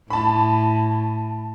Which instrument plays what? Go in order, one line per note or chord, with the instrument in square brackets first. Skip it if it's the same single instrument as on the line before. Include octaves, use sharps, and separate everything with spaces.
[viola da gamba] A2 [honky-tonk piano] A5 B5